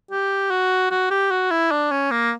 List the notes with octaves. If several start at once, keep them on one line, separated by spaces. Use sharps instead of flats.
G4
F#4
F#4
G4
F#4
E4
D4
C#4
A#3